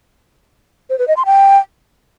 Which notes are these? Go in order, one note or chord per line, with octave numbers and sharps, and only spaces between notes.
C5
B4
D#5
C6
G5